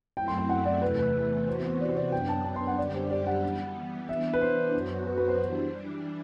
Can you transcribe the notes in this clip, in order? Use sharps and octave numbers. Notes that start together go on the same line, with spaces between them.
F#2 F#3 A3 C4 E4 G5
C6
G5
F#5
D5
E2 C3 E3 A3 B4
B4
C3 E3 B3 F#4 C5
C5
D5
C5
D5
F#2 F#3 B3 D4 G5
A5
A5
C6
F#5
F#2 D3 G3 D4 G4 D5
C5
D5
F#5
E3 G3 B3
E3 B3 D4 E5
B4
C5
F#2 F#3 B3 F#4
B4
B4
C5
E3 G3 D4